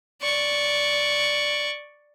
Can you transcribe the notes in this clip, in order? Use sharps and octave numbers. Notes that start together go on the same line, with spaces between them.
D5 C#6